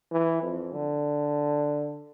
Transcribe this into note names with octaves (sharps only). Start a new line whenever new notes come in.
E3
F2
D3